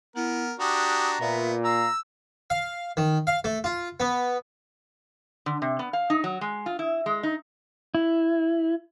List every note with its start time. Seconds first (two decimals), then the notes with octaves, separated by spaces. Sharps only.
0.16 B3 E4 A#4
0.60 D4 F#4 G4 A#5 D#6
1.20 A#2 B3 E5
1.64 F5 A#5 E6
2.50 F5
2.97 D#3
3.27 F5
3.44 A3
3.64 F4
4.00 B3
5.46 D3
5.62 C3
5.79 B3
5.93 F5
6.10 D#4
6.24 F#3
6.41 G#3
6.66 F4
6.79 E4
7.06 G#3
7.23 D#4
7.95 E4